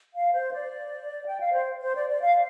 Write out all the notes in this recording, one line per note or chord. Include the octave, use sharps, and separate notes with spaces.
F5
C5
D5
G5
F5
C5
C5
D5
D5
F5